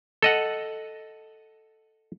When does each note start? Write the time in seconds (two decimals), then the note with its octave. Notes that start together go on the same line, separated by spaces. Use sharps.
0.22 A4 D#5 F#5